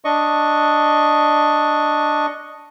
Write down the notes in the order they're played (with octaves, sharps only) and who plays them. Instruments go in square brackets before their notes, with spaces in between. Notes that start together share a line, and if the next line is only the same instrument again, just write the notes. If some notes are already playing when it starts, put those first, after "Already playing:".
[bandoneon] D4 D#5 C#6